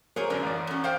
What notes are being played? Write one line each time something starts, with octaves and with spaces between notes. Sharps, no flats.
F#3 A#3 G#4 A#4 C5 C#5
F#2 D3 D4 A#4
A1 D5
F#2 C#4
C5 F5 G5